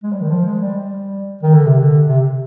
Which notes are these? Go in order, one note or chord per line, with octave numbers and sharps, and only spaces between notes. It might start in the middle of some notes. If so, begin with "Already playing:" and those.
G#3
G3
D#3
F3
G#3
G3
G3
D#3
D3
C3
D3
C3